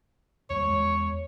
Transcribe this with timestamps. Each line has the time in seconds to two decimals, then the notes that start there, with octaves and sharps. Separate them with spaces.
0.50 D#2 G3 C#5
0.65 E2 G#3